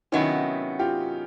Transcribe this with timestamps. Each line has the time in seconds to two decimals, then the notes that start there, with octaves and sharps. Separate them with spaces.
0.12 C3 D#3 F#3 B3 C#4 D#4 E4
0.79 F4 G4